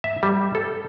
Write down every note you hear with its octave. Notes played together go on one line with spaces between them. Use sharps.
E5
G3
A4